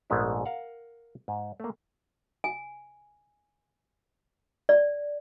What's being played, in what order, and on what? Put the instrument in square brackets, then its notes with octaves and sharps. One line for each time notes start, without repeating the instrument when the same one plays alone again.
[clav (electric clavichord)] A#1 G#2 G#3 A3 B3
A#4 F5 F#5
G#2
A3 A#3
[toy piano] G#5
D5